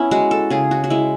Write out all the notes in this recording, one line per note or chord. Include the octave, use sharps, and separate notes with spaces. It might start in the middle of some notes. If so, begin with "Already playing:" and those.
Already playing: B3 C#4 E4
G#3 F#4
A4
C#3 G#4
F#4
F#4
G#3 E4